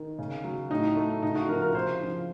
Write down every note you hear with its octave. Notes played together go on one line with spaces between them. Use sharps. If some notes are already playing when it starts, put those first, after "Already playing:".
Already playing: D#3
C#3
F#3
A2 D#4
A3
C#3 D#4
F#4
F3 A#4
A#4
C#3 C5
F3